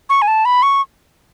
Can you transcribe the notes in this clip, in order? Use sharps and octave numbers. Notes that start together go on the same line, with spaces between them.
C#6
G#5
A5
B5
C#6